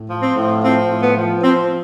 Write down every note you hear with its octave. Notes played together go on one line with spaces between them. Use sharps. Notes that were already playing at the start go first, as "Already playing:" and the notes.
Already playing: A2
F3
C4
A2
F3 C4
A2
B3
F3
F3 C4